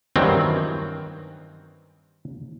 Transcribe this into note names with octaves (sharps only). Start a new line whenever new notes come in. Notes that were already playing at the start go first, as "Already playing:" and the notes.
G2 D#3 E3 F#3 C4